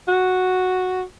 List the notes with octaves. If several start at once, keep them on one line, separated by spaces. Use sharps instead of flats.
F#4